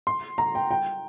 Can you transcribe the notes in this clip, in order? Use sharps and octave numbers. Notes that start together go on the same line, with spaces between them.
C6
A#5
G5
G5